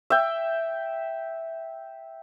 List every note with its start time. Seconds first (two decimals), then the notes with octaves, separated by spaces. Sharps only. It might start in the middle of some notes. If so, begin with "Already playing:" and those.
0.10 E5 G5